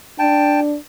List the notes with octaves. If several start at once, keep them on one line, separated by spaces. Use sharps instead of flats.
D4 G5 A5